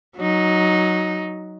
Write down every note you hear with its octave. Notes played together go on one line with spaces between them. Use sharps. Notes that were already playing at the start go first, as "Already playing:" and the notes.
F#3 D#4